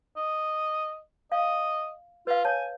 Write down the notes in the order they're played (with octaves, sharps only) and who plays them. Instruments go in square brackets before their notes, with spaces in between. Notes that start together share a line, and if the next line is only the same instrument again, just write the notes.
[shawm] D#5
[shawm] D#5 [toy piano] F5
[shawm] F4 [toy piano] B4 F5
[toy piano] C#5 A5 [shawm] G#5